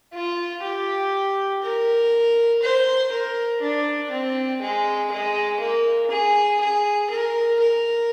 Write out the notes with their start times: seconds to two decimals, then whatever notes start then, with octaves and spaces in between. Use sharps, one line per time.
0.13 F4
0.63 G4
1.63 A#4
2.62 C5
3.12 A#4
3.61 D4
4.11 C4
4.62 G#3
5.11 G#3
5.60 A#3
6.11 G#4
6.60 G#4
7.10 A#4
7.60 A#4